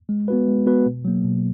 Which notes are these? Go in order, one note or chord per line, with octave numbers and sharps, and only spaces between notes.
G#3
B3 F#4 B4
G#3
B3 F#4 B4
B2
F#3 A#3
B2